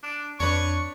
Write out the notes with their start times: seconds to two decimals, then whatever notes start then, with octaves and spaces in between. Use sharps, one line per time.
0.03 D4
0.40 F2 D4 B4 C#5 C#6